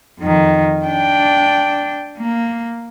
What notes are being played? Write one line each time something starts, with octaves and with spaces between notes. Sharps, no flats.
F2 D#3
D4 G5
A#3